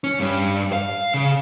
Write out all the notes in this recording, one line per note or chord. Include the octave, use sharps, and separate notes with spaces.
C#4
G2
F5
C#3